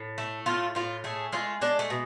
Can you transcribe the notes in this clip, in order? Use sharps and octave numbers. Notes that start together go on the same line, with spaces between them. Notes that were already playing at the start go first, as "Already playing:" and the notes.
Already playing: A2
A3
A2 F4
A2 F4
A3 G#4
G#3 F4
G#3 D4
A3
B2